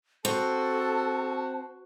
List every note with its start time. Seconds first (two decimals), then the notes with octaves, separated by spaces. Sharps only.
0.25 C4 F#4 A4 A5